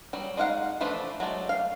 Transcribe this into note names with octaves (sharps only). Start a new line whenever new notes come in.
F#3 G3
G#3 D#4 F5 F#5
E3 F3 A3 D4 B5
F#3 G#3 A3 D5
F5